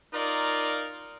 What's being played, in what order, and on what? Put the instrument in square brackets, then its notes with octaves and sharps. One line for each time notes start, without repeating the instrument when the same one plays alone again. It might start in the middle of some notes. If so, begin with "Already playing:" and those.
[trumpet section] D#4 F4 A#4 D5